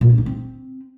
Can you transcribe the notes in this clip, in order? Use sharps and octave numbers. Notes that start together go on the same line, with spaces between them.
A#2
D4
D#4
C4